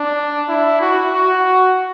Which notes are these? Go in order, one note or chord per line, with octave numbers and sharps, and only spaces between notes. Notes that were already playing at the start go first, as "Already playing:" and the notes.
Already playing: D4
E4
F#4
F#4